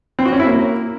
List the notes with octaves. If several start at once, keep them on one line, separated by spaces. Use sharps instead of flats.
C4
F#4
C#4
E4
A#3